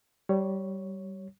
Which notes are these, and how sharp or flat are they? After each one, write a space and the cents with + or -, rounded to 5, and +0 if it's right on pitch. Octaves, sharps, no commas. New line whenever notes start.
G3 -20 C#5 +0